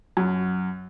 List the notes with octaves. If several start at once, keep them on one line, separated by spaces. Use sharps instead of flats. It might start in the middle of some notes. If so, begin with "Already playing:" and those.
F#2